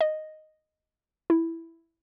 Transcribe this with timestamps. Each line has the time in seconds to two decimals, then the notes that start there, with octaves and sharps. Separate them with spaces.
0.01 D#5
1.30 E4